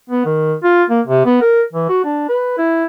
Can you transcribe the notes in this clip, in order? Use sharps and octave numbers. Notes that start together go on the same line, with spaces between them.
B3
D#3
F4
A#3
C3
B3
A#4
E3
F#4
D4
B4
E4